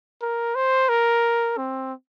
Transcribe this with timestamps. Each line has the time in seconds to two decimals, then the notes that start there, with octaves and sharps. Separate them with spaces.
0.22 A#4
0.55 C5
0.89 A#4
1.57 C4